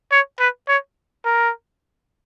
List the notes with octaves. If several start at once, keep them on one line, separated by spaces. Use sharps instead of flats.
C#5
B4
C#5
A#4